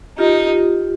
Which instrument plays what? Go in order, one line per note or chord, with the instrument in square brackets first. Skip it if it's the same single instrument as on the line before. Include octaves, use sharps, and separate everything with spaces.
[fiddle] D#4 [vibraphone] F4 G4